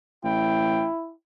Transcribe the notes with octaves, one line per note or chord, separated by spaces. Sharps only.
A1 E4 G5